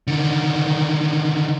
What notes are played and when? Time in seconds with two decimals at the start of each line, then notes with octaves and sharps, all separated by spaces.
0.07 D3 D#3